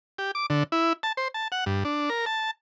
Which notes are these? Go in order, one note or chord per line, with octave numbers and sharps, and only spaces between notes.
G4
D6
D3
E4
A5
C5
A5
F#5
G2
D4
A#4
A5